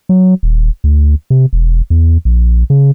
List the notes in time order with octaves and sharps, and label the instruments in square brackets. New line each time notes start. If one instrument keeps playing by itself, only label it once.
[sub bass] F#3
D#1
D2
C3
E1
E2
A#1
C#3